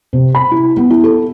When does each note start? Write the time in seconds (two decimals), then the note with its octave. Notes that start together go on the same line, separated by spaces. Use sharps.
0.13 C3
0.35 B5
0.51 E4
0.77 B3
0.90 E4
1.04 A4